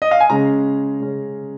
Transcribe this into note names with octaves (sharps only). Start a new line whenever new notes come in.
D#5
F5
G#5
C#3 G#3 C#4 A#5
C#3 G#3 C#4